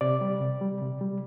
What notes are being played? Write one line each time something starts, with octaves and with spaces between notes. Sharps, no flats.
C3 D5
G3
C3
G3
C3
G3